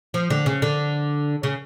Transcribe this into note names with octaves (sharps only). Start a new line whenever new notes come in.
F3
D3
C#3
D3
C#3